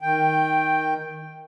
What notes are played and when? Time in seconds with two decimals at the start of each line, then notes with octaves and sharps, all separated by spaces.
0.01 D#3 G5